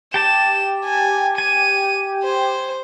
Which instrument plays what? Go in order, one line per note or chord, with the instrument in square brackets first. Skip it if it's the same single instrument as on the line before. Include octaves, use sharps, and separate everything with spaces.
[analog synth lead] G4 [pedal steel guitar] G5 A5 [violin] E7
[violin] G#5
[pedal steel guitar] G#5 [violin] D#7
[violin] C5